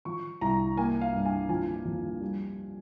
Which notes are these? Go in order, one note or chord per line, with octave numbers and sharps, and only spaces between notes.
F3 C#6
C2 A#5
A#3 G#5
F5
G2
G#5
F3 G#5
F2
G3